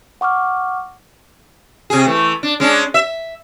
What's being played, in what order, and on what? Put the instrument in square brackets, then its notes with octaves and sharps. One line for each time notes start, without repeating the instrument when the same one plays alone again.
[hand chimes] F#5 C#6 D6 F6
[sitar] C3 G#4
E3 A3
D4
G#3 C#4 D4
E5